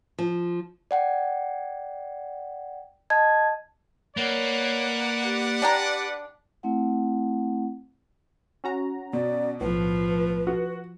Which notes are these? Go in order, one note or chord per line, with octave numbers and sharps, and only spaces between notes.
F3
D5 F#5 G5
D#5 A5 G#6
A#3 B4 C#5 D5 F#5
G4
D4 G5 A#5
A3 C4 E4 F#5
C#4 F#4 A#5
B2 D5
B1 A2 F3 B4
F#4